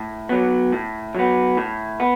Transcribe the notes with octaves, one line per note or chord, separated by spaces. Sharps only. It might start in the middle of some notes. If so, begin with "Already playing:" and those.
Already playing: A2
F#3 B3
A2
F#3 B3
A2
B3